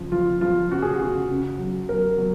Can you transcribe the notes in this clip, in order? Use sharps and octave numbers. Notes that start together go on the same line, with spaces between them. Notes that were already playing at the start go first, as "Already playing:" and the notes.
Already playing: C#3 F3
F3 F4
F3 F4
C#3 F#4
G#4
F#4
C#3
C#3
F#3
F#3 A#4
F#3